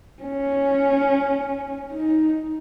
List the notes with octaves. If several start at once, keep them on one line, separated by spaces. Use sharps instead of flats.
C#4
D#4